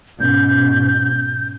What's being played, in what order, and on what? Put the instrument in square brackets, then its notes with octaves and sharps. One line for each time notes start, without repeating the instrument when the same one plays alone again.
[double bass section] G#2 B2 [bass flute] C#4 [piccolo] G6